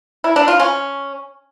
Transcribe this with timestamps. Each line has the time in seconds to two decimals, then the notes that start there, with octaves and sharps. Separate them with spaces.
0.24 E4
0.36 D4
0.48 F4
0.60 C#4